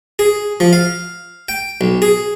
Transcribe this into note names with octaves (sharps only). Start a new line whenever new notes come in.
G#4
F3
F5
G5
B1
G#4